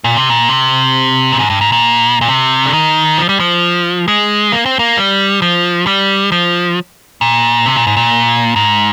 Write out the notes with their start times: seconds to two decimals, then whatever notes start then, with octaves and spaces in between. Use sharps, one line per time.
0.04 A#2
0.17 C3
0.30 A#2
0.49 C3
1.32 A#2
1.39 G#2
1.50 G2
1.61 G#2
1.72 A#2
2.21 A#2
2.28 C3
2.66 D3
2.73 D#3
3.18 F3
3.29 G3
3.40 F3
4.08 G#3
4.52 A#3
4.66 C4
4.79 A#3
4.97 G3
5.42 F3
5.87 G3
6.32 F3
7.21 A#2
7.66 C3
7.76 A#2
7.87 G#2
7.97 A#2
8.56 G#2